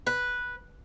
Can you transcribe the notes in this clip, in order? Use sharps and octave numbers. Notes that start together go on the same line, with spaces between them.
B4